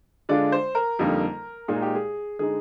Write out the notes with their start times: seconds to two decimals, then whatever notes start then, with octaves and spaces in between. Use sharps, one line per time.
0.29 D3 G#3 D4 F4 D5
0.52 C5
0.75 A#4
0.99 F2 D3 G3 A#3 D#4
1.68 A#2 G#3 D#4 G#4
1.82 G4
1.95 G#4
2.39 D3 G#3 D#4 G#4